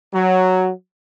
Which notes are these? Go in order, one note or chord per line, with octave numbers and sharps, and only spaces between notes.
F#3